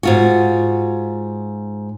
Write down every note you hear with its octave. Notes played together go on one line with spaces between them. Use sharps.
G#2 F4 F#4